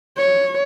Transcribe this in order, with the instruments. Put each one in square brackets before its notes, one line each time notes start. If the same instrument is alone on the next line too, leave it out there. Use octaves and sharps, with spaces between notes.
[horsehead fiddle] C#5